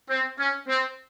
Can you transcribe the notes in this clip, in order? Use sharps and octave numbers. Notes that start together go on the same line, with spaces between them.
C4
C#4
C4